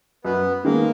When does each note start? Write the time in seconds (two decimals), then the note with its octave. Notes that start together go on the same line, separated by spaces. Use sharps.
0.25 F#2 B3
0.64 D#3 G#3 A#3 B3 D#4